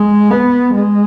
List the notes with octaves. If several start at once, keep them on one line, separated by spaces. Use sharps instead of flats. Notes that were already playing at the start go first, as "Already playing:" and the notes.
Already playing: G#3
B3
G#3